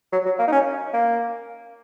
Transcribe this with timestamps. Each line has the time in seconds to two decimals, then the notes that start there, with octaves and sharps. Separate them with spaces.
0.12 F#3
0.25 F#3
0.39 A#3
0.48 D#4
0.52 C#4
0.93 A#3